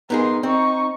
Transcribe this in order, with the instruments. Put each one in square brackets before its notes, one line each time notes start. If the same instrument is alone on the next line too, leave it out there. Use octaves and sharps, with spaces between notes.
[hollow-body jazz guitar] B3 D#4 G#4 [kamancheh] A#4 C6
[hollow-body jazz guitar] C4 [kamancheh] D#4 C#6